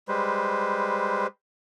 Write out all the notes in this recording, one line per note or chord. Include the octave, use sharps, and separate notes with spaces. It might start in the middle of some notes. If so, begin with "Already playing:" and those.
G3 G#3 B4 C5